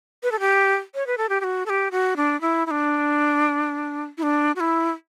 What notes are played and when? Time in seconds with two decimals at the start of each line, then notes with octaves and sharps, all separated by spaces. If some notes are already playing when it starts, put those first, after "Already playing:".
0.23 B4
0.32 A4
0.40 G4
0.95 C#5
1.07 B4
1.18 A4
1.29 G4
1.41 G4
1.44 F#4
1.66 A4
1.69 G4
1.91 F#4
2.17 D4
2.41 E4
2.66 E4
2.71 D4
4.18 E4
4.23 D4
4.56 F#4
4.60 E4